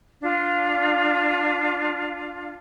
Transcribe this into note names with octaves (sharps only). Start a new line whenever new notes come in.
D4 F4 F5